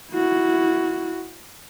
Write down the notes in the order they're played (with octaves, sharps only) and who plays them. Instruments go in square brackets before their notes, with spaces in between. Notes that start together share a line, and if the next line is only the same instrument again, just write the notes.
[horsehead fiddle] E4 F#4